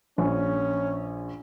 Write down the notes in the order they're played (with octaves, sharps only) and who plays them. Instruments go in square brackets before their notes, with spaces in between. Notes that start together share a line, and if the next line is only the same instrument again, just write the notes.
[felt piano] A#1 [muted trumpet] C#4